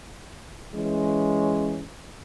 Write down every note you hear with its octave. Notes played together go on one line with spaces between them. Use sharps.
E3 G#3 C#4